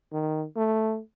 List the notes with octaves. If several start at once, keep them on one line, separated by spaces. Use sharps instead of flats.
D#3
A3